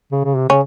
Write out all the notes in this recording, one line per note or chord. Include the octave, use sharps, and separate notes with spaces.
C#3
C#3
C3
C#3 C#4